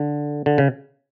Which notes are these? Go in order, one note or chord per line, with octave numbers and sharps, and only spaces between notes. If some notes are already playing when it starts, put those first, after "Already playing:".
Already playing: D3
D3
C#3